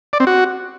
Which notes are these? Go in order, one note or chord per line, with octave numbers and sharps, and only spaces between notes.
D5
C4
F#4